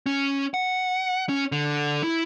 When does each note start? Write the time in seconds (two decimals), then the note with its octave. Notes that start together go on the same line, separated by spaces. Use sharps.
0.06 C#4
0.54 F#5
1.29 C#4
1.52 D3
2.04 E4